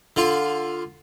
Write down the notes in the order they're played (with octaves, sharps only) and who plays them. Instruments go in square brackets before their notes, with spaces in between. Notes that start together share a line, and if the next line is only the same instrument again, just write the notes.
[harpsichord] D3 F4